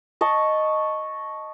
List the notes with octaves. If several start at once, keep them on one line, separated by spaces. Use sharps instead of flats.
D#5 A5 C#6